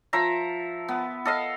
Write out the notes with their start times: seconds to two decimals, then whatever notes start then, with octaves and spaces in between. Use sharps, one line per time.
0.13 F3 E5 A#5
0.88 B3
1.25 A4 D#5 F5